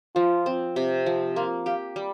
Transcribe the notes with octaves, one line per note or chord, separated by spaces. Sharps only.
F3 F4
C4
C3
F3
A#3 F4
G4 F5
G3